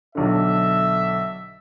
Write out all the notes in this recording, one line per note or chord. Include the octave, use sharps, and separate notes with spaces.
B1 D3 E5